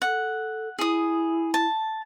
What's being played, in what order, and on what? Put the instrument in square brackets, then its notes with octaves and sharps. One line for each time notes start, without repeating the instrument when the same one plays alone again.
[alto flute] A4 [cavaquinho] F#5
[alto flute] E4 [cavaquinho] G#4 D#6
[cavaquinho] A5